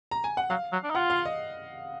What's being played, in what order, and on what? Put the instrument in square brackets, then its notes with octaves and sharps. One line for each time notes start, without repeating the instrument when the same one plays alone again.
[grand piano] A#5
G#5
F#5
[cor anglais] F#3 [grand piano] F5
[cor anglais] F#3
D4
D#4
[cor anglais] F4 [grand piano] F#5
[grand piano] F5
D#5